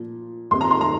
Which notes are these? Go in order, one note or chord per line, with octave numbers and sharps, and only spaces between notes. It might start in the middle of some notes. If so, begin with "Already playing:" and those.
Already playing: A#2 F3
D#2 D#3 C4 C6
A#5
C6
A#5